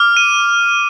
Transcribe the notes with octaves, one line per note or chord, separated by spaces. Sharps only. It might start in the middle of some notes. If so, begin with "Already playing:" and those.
Already playing: D6 F6
D#7